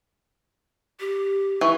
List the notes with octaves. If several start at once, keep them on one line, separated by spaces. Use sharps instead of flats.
G4
E3 C#6